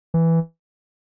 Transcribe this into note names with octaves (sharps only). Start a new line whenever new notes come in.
E3